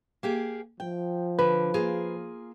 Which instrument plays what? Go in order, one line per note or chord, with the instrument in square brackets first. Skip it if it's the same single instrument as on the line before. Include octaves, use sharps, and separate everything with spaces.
[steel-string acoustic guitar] A#3 G4 G#4
[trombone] F3 [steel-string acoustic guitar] G5
[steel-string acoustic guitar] D3 [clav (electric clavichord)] B4
[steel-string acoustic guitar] A#3 F4 G#4